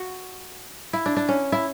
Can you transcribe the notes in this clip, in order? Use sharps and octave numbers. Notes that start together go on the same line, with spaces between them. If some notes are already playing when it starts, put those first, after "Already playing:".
Already playing: F#4
E4
D4
D4
C#4
E4